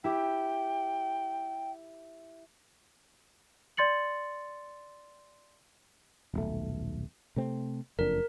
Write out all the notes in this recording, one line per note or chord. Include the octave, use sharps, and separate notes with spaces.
E4 G4 G5
D5 C6 A6 C#7 F#7
D#1 B1 A3
C3 A3 C4
F#1 F2 D4 A#4